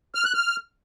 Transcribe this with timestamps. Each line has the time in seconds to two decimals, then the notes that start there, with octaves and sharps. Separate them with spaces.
0.15 F6
0.24 F#6
0.34 F6